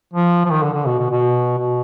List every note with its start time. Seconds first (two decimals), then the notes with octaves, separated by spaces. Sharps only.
0.13 F3
0.45 F3
0.50 D#3
0.62 D3
0.73 D3
0.86 B2
0.98 B2
1.10 B2
1.58 B2